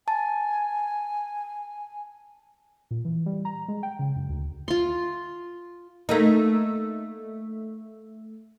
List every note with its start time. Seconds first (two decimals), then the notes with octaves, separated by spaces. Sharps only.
0.08 G#5 A5
2.91 A#2
3.05 E3
3.26 G3
3.45 A#5
3.68 G#3
3.83 G5
3.99 C#3
4.16 F#2
4.29 D2
4.68 F4 C6
6.09 A3 A#3 D#4